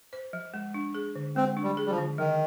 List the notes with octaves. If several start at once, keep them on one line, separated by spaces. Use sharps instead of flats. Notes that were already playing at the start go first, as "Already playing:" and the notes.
C5
F3
G#3
D4
G#4
D3
G#3 C4
D4
G3
G#4
G3
F3
D3
D#3 F3